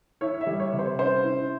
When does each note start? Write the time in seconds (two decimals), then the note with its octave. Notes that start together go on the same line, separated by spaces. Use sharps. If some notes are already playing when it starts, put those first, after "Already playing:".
0.21 E4 C#5
0.41 E5
0.46 G3
0.60 C#5
0.73 C3
0.79 C5
0.99 C#4 C5
1.24 E4